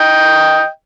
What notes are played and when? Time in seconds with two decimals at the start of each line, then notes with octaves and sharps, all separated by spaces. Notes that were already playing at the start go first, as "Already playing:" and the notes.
Already playing: D#5 G5